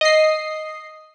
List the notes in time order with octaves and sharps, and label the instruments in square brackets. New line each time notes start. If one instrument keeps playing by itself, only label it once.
[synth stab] D#5 C7